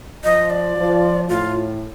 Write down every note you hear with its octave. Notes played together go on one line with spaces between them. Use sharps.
F3 D#5
D5
F3
A2 F4